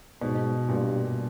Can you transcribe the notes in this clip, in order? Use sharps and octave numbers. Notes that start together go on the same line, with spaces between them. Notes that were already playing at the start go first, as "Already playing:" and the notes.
G#2 B2
G2 A#2